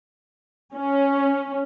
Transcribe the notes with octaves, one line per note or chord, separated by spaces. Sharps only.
C#4